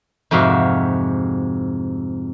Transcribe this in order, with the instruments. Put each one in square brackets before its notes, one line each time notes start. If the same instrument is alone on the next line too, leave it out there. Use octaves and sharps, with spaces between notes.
[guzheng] F2 G#2 C3 F#4 E5 F5